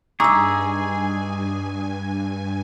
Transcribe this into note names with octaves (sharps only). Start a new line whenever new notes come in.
G2 D#4 G#4 E5 G#5 C#6 D6 E6